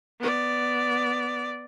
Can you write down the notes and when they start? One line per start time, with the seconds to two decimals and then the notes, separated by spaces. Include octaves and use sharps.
0.20 B3 D5